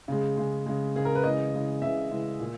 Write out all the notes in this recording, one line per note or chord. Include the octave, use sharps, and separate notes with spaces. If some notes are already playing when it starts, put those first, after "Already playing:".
C#3 G#3
C#3 G#3
C#3 G#3
C#3 G#3 G#4
A#4
B4
C#3 E3 G#3 D#5
C#3 E3 G#3
C#3 E3 G#3 E5
C#3 E3 G#3
A#2